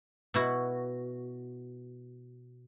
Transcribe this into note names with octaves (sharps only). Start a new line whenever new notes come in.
B2 E4 F#4